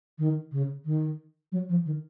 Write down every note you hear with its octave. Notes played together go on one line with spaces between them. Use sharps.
D#3
C#3
D#3
F#3
F3
D#3